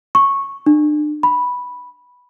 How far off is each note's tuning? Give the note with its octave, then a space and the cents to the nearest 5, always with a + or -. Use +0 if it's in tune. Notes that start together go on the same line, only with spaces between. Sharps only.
C#6 -10
D4 +35
B5 -5